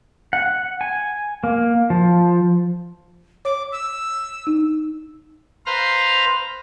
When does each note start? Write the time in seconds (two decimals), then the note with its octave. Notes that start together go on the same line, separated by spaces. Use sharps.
0.33 F#5
0.81 G#5
1.44 A#3
1.90 F3
3.45 C#5 D6
3.72 E6
4.47 D#4
5.66 B4 C5 F5 A#5 C6 F6